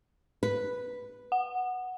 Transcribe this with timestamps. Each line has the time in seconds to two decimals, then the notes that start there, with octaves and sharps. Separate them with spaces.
0.43 B4
1.32 F#5